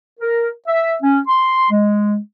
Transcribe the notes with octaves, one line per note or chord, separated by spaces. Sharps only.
A#4
E5
C#4
C6
G#3